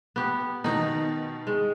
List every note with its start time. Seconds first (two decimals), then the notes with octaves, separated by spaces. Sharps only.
0.16 B3 G4
0.64 B2 D#3 D#4
1.47 G#3